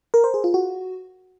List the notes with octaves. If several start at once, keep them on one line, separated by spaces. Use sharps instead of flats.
A#4
C5
G#4
F4
F#4